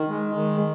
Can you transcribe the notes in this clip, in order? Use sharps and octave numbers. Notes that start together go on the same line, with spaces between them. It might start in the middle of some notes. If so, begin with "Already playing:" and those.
Already playing: D#3
G#3
D#3